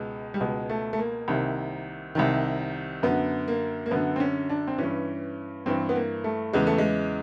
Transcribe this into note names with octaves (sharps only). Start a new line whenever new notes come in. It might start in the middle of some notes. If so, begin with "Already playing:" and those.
Already playing: C#2 B2 G#3
G3
C#2 B2 G#3
A3
A3
A#3
C2 C3 D#3
C2 C3 D#3
F#2 D3 B3
A#3
A#3
F#2 D3 B3
C4
C#4
D4
C4
G2 E3 C#4
G2 E3 C4
B3
A#3
A3
E2 C#3 E3 G#3
A3
G#3